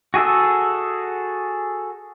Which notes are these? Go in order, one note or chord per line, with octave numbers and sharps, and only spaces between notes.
F#4 G#4 A4 E5